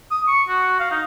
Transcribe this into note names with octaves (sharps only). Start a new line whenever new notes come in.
D#6
C#6
F#4
F5
D#4